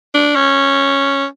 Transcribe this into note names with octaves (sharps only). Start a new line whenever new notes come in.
D4
C#4